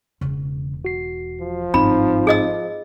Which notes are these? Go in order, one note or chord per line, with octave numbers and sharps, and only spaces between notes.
E1 E2 C#3
F#4 C7
F3
G1 G#2 C4 D#4 B5
G#4 D#5 E6